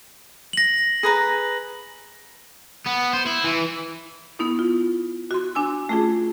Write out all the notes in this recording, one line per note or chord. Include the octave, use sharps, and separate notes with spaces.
A#6 F#7
G#4 B4 A#5
B3
C5
E4
E3
B3 D#4 E4
F4
F#4 C6
D4 G#5 E6
A3 C#4 F4 G#4